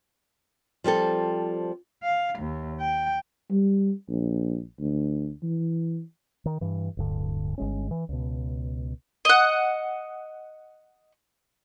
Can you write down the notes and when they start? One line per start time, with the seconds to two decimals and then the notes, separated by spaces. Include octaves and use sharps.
0.84 F3 G3 C4 A4
2.03 F5
2.40 D#2
2.80 G5
3.50 G3
4.09 A#1
4.80 D2
5.42 E3
6.45 D#3
6.61 G2 E3
6.97 D1 G2 D3
7.58 G1 G#3 C#4
7.91 E3
8.09 C#2 B2
9.25 D#5 F#5